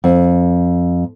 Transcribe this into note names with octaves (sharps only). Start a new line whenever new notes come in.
F2